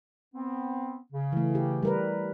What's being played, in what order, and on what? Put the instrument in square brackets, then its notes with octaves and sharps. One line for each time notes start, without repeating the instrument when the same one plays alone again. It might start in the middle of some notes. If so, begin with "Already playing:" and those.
[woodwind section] B3 C4
C#3
[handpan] E3 A3
G4
G3 A#4 B4